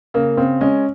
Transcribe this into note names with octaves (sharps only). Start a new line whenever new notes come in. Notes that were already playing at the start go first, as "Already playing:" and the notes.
C#3 A#3
C#3 C4
G#3 C#4